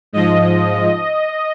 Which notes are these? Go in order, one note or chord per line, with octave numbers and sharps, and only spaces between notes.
G#2 F3 D#5